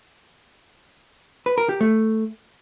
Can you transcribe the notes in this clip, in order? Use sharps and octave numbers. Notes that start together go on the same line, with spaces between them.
B4
A#4
G4
A3